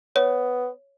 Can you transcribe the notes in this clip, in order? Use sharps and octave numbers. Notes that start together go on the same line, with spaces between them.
B3 C#5